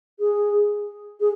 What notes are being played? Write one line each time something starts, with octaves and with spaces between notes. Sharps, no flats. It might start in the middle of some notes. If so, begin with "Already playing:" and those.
G#4
G#4